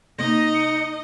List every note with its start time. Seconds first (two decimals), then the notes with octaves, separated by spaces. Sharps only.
0.18 C3 A#3 D#4 D#5 A#6
0.55 C#7